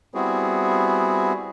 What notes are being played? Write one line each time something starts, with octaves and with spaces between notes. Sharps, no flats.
G3 B3 C4 E4 F#4 G#4